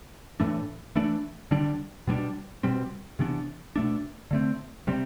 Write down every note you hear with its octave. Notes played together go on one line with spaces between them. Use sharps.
A2 E3 A3 D4
E3 A3 D4
D3 G3 D4
B2 G3 B3 D4
B2 G3 C4
C3 E3 B3 D4
B2 A3 D4
D3 A3 C4
C3 G3 C4